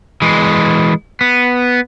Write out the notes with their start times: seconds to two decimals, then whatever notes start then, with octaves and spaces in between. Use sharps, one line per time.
0.22 E3 G#3
1.21 B3